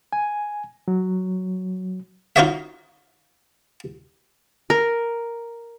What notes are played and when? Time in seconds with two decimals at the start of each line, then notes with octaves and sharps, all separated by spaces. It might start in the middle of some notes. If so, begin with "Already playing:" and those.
0.13 G#5
0.88 F#3
2.36 D#4 F4 F#4 C#5 D#5 E5
4.70 A#4